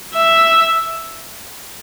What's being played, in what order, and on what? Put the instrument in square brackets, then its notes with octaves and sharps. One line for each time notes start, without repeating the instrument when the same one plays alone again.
[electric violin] E5